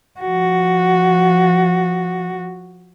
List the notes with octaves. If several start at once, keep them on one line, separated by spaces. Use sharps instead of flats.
F3 F#4